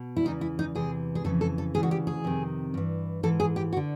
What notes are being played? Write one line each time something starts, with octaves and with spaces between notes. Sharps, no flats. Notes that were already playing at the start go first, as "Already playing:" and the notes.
Already playing: B2
E4
E2 C#3 E3 D#4
E4
D#4
E2 C3 E3 G#4
G#4
F2 C#3 E3 A4
A4
A4
D2 C#3 E3 G#4
F#4
G4
G#4
F2 C3 D#3
G2 E3
G#2 E3 A4
G#4
G4
F#4
D3